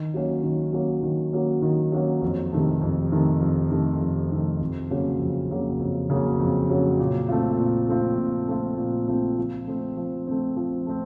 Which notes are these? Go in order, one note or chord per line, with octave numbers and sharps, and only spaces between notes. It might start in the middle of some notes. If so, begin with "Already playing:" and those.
Already playing: D#3
F#3 A#3 C#4
D#3
F#3 A#3 C#4
D#3
F#3 A#3 C#4
D#3
F#3 A#3 C#4
F2
C3 D#3 A3
F2
C3 D#3 A3
F2
C3 D#3 A3
F2
C3 D#3 A3
F2
C#3 F#3 A#3 C#4
F2
C#3 F#3 A#3 C#4
F2
C#3 F#3 A#3 C#4
F2
C#3 F#3 A#3 C#4
A#2
A3 C4 F4
A#2
A3 C4 F4
A#2
A3 C4 F4
A#2
A3 C4 F4
F3
A3 C4
F3
A3 C4
F3
A3 C4